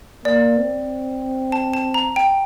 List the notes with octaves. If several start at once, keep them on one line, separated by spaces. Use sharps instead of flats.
A#3 D5
C4
A5
A5
A#5
G5